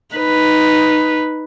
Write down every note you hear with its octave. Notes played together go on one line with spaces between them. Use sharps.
D#4 B4